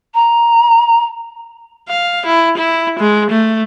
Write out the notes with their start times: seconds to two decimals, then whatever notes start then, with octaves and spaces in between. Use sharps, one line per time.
0.14 A#5
1.89 F5
2.26 E4
2.58 E4
3.00 G#3
3.31 A3